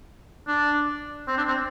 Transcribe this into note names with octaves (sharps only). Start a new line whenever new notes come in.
D4
C4
D4
C4